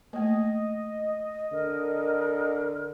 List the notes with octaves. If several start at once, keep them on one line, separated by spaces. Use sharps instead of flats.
A3 A#3 D#5
D3 A#4